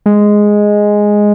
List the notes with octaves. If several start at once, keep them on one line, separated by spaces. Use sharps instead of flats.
G#3